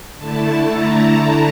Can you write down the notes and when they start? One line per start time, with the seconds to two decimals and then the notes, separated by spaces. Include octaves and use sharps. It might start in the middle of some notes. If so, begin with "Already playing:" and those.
0.18 D3 A3 E4 A5
0.71 A#5